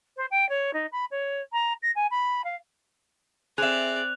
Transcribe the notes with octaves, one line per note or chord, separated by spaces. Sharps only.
C5
G5
C#5
D#4
B5
C#5
A#5
A#6
G#5
B5
F5
C4 G#4 D5 E5 F#6 F7